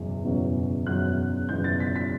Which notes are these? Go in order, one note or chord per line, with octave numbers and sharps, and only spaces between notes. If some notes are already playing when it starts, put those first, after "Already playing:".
Already playing: F#1 E2 B2 F#3 C#4
F#1 E2 B2 F#3 C#4
F#1 E2 B2 F#3 C#4 F#6
F#1 E2 B2 F#3 C#4 G6
A6
B6
B6